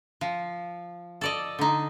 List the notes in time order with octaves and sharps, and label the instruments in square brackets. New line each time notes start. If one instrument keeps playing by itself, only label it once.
[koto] F3
A4 D5 D#5
D3 D#4